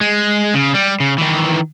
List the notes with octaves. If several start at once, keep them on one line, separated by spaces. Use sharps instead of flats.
G#3
C#3
G3
C#3
D#3 E3